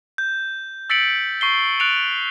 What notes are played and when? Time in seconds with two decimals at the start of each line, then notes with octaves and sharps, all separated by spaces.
0.18 G6
0.90 E6 A6 B6 C#7 D7 F#7
1.41 C#6 C7 G7
1.80 F#6 A6 C#7 D7 F7